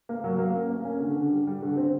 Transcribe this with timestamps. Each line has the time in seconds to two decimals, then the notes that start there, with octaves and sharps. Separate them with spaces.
0.09 A#3
0.24 F#3
0.39 A#3
0.54 C#4
0.70 A#3
0.85 C#4
1.00 D3
1.16 D3
1.31 G3
1.47 G3
1.62 D3
1.77 C4